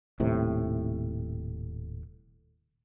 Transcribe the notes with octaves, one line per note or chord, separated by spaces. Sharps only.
D#1 A2 C3